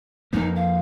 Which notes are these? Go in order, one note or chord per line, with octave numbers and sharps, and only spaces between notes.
F2 F3 A#3 D#4
F5